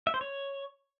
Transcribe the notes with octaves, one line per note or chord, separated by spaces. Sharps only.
E5
C5
C#5